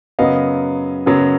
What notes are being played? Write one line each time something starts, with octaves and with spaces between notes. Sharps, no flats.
F#2 C#3 F#3 B3 D#5 F5
F#2 C#3 F#3 B3